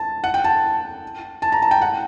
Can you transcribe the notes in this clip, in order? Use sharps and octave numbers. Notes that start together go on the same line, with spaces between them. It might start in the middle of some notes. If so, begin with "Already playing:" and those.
Already playing: A5
F#5
G5
A5
A5
A#5
A5
G5
F#5